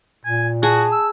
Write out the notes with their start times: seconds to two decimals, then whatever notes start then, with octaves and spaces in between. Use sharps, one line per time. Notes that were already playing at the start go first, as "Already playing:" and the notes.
0.25 A#2 G#5
0.63 F#4 G#4 A5
0.92 E6